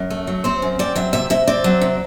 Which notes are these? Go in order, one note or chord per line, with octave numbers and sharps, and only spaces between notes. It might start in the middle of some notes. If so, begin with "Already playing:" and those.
Already playing: F#2
A3
F#3
C4 C5
F#2
C4 D5
F#3 E5
C3 E5
C3 E5
C4 D5
F#3
C3